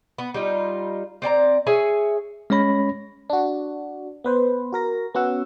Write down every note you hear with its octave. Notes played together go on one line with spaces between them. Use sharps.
B3
G3 D#4 F4
C4 D5 G5 A#5
G#4 C#5 E5 G#5
G#3 C#4 C#5 B5 A#6
D4 F#4
B3 B4 C5
F#4 A#4 A#6
B3 C#4 F#4 F#5 E6